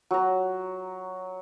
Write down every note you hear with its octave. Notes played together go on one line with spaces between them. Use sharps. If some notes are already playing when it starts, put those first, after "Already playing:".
F#3 A#5